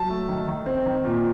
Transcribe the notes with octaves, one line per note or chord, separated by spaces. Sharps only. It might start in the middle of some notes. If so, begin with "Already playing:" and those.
Already playing: F#3 A5
A3
D#3
D#3
C4
D#3
A#2